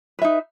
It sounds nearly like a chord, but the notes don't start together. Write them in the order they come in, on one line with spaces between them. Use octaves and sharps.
B4 E5 D#4